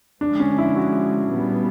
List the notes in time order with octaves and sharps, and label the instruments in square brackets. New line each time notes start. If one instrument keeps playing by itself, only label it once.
[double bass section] D3 F3 G#3 [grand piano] D4
[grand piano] C#4
E4
F#4
[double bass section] A#2 G3 B3